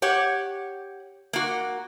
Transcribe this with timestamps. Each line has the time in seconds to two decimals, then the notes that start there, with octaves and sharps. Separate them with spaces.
0.02 G4 C#5 F#5
1.33 A#3 F#4